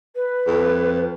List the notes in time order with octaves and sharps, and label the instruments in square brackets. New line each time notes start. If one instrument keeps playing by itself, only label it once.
[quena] B4
[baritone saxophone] F2